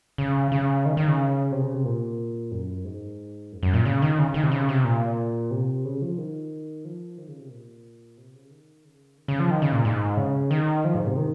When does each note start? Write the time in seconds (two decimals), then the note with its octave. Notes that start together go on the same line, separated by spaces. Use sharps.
0.18 C#3
0.52 C#3
0.85 D#3
0.97 D#3
1.08 C#3
1.52 C3
1.63 C#3
1.74 C3
1.85 A#2
2.52 F#2
2.84 G#2
3.52 F#2
3.63 F#2
3.73 A#2
3.85 C#3
4.02 D#3
4.19 C#3
4.34 D#3
4.43 C3
4.52 C#3
4.69 C3
4.85 A#2
5.51 C3
5.85 C#3
6.02 F3
6.18 D#3
6.85 F3
7.18 D#3
7.28 C#3
7.39 C3
7.51 A#2
8.17 C3
8.35 C#3
8.50 D#3
8.85 C#3
9.17 D#3
9.28 C#3
9.40 F3
9.51 D#3
9.62 C#3
9.73 A#2
9.85 G#2
10.17 C#3
10.51 D#3
10.85 F3
10.95 G#2
11.07 C3
11.17 D#3